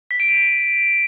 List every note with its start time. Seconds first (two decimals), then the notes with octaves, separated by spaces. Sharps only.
0.11 B6
0.20 D7
0.29 D#7